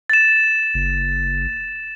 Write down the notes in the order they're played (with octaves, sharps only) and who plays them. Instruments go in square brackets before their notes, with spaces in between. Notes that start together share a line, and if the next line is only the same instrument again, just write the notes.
[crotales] A6 E7
[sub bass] F#1